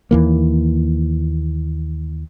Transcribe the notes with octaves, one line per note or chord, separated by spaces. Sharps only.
D#2 E3 A#3